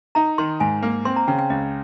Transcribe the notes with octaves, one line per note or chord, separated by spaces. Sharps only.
D#4 A#5
D#3 C6
G#2 G#5
A#3
C4 C6
A#5
C#3 G5
G5
C#2 D#5